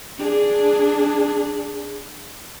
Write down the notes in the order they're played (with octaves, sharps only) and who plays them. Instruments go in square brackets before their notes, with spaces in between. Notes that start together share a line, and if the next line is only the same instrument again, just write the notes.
[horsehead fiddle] D4 G#4